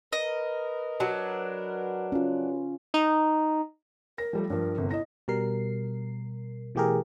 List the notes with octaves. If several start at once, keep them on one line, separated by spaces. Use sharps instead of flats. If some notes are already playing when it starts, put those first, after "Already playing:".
A#4 B4 D#5
F#3 D4
C#4 F4
D#4
A#4 A#6
F3 G3 A3
G2 F3 A#4
G1 C3
E4 D#5 A#6
B2 G3 A#4 C7
B2 E3 A3 G4 G#4 A#4